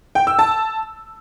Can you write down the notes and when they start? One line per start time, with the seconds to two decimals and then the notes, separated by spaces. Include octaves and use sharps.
0.15 G5
0.27 E6
0.39 A5